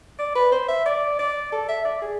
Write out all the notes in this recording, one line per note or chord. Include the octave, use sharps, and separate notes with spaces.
D5
B4
C5
E5
D5
D5
A4
E5
D5
G#4